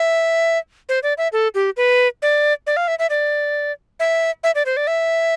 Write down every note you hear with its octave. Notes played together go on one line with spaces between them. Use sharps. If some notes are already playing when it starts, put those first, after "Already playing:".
Already playing: E5
C5
D5
E5
A4
G4
B4
D5
D5
F5
E5
E5
D5
E5
E5
D5
C5
D5
E5